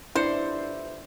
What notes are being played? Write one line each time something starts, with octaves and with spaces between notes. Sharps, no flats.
G1 D4 E4 B4 C5 E5 C#7 E7